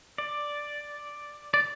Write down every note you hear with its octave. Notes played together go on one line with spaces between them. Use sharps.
D5
D5